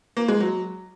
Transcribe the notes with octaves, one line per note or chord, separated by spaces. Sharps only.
A#3
G#3
F#3